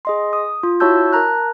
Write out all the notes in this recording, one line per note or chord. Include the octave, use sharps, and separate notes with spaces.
G#4 D#5 C6
D#6
F4
E4 F#4 C#5 A5 E6 G6
A#4 A5 A#5 F#6